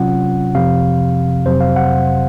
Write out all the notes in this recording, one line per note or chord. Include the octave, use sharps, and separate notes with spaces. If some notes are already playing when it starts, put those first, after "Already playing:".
Already playing: C3 F#3 C#4 F4 F#5
F2 C3 F3 F5
F2 C3 F#3 C5
F5
F#5